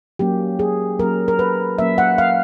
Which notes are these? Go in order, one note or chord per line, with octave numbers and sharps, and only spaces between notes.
F#3 A#3 C#4 G4
G#4
F#3 A#3 C#4 A#4
A#4
B4
F#3 A#3 C#4 E5
F#5
F5